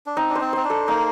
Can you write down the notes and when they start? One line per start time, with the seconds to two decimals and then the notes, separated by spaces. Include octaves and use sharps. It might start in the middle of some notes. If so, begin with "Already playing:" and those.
0.06 D4
0.17 C4 D#4
0.30 D4
0.35 C5
0.41 C4
0.53 C4 C5
0.64 D4
0.70 A4
0.88 A#3 D#4